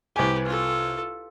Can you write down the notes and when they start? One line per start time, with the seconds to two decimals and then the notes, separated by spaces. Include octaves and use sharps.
0.16 C2 G4 B4 G#5
0.45 F4 A4